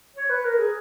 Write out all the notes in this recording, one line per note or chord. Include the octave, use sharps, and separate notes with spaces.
C#5
B4
A#4
G#4